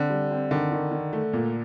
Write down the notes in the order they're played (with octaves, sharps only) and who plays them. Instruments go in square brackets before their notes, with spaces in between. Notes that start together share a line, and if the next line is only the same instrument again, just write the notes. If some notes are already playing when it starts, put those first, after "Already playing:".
Already playing: [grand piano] D3 [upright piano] C4
[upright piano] G3
C4
[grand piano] D3 [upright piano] D#3
[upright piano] D#3
D#3
A3
A#2